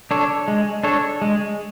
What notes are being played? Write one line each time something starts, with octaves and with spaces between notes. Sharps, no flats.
D4 A4 C#5
G#3
D4 A4 C#5
G#3